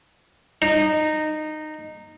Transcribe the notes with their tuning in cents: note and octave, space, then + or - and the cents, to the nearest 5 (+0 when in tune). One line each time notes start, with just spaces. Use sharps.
D#4 -15